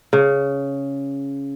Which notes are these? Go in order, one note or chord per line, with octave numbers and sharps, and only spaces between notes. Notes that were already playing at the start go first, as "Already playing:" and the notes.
C#3